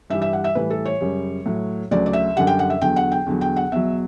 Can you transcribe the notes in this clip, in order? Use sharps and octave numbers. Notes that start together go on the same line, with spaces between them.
G2 E3 G3 E5
E5
F#5
E5
A2 E3 G3 B4
A4
C#5
F#2 C#3 G3
A2 F#3
D2 C#3 F#3 D5
D5
E5
F#2 D3 G3 F#5
G5
F#5
E5
E2 D3 F#3 G5
F#5
G5
E2 D3 F#3
G5
F#5
E2 B2 F#3 E5